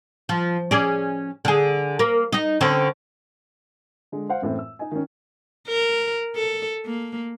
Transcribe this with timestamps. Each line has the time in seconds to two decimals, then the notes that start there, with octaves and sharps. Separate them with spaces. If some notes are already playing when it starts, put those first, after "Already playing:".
0.29 F3
0.71 C#4 G#4 D5
1.45 D3 G#4
1.99 A#3 A#4
2.32 D#4 D#5
2.61 D3 C4 C#4
4.12 D3 G#3
4.29 C5 F5 F#5
4.42 F#2 A2 E3 C4
4.59 E6
4.79 D#4 D#5 G#5
4.91 D#3 C#4
5.68 A#4
6.36 A4
6.86 A#3